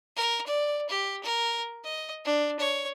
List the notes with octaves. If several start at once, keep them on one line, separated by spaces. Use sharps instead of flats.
A#4
D5
G4
A#4
D#5
D4
C#5